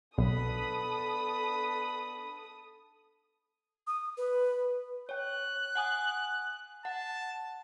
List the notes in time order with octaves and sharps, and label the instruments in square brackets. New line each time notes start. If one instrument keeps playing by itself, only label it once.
[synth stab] B1 [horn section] B3 D4 B5 [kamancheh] A4 D#6
[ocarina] D#6
B4
[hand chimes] C#5 G5 [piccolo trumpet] F#6
[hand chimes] F#5 G#5 D#6
[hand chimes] F#5 [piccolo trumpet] A5